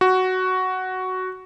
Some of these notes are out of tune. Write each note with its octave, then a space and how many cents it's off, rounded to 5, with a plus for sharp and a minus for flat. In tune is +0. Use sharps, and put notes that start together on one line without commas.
F#4 +5